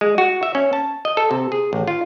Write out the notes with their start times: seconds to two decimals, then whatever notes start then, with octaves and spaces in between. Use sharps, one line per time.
0.01 G#3
0.18 F#4
0.43 E5
0.55 C#4
0.73 A5
1.05 D#5
1.17 A4
1.31 C3
1.52 G#4
1.73 A1
1.88 F4